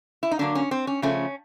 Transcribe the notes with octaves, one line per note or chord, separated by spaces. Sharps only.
E4
D#4
D3 F#3 A#3 D4
C#4
C4
C#4
C#3 F3 A3 C#4